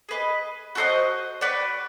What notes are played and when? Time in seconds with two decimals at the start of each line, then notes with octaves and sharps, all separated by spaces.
0.09 G#4 B4 D#5
0.75 F#4 A4 C5 D#5
1.41 F#4 B4 D5